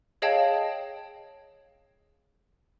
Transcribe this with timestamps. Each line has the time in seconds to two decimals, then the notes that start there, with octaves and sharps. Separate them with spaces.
0.22 G#4 C#5 D#5 F5 G5 A5